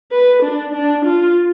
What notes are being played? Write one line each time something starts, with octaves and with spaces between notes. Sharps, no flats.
B4
D4
D4
F4